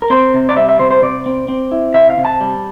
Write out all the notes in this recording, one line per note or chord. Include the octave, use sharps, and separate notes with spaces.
A#4
C4 C5
C3
D5
G3 E5
E5
C3 C5
C5
C3 D5
C4
C4
E4
C3 E5
F5
C3
A5
G3